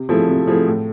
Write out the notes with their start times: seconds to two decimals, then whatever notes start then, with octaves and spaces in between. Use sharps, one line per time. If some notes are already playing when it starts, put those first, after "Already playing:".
Already playing: C3
0.09 F3 A3 E4 G#4
0.28 C3
0.47 F3 A3 E4 G#4
0.67 A2